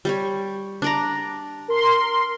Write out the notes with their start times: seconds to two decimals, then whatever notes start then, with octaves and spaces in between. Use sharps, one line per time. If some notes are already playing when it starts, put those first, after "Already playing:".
0.05 G3 G4 C#5
0.82 D4 D5 A#5
1.68 A#4 C6